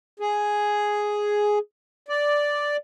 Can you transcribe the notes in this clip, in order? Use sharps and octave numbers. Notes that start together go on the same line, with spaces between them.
G#4
D5